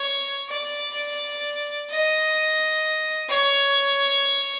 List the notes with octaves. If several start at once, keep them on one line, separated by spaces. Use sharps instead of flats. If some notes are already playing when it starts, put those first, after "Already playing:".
Already playing: C#5
D5
D#5
C#5